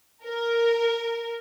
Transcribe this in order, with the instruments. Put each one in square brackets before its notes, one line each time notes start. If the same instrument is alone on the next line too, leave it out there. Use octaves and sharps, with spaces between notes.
[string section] A#4